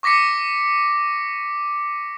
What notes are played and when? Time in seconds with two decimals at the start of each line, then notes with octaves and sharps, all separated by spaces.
0.03 C#6 D6 A#6 B6 C#7